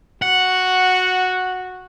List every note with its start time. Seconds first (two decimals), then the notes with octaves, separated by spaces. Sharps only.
0.22 F#4 F#5